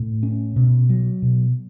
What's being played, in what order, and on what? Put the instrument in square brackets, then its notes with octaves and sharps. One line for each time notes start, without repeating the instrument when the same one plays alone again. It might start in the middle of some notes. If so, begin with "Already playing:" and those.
Already playing: [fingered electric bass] A2
C#4
B2
F#3
B2